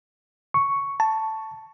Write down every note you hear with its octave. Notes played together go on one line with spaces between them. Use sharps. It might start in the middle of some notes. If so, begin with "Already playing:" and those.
C#6
A5